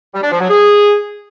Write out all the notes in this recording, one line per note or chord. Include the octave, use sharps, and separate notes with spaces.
G3
D4
F3
F#3
G#4